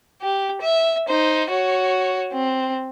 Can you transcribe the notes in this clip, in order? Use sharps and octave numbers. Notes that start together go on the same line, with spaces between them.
G4
E5
D#4 C5
F#4 C#5
C4